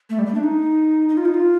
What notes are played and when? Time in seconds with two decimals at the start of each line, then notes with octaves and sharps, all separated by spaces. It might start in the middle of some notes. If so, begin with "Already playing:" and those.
0.10 A3
0.19 G3
0.26 A3
0.34 D4
0.43 D#4
1.09 D#4
1.17 F4
1.25 D#4
1.34 F4